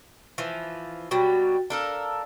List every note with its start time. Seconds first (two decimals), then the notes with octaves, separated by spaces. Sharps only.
0.38 E3 F3
1.11 B2 F#3 G3 F#4 G5
1.70 D4 A4 A#4 F5 E6